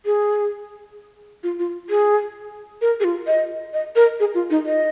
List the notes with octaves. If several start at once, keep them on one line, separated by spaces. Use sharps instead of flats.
G#4
F4
F4
G#4
A#4
G#4
F4
D#5
D#5
A#4
G#4
F4
D#4
D#5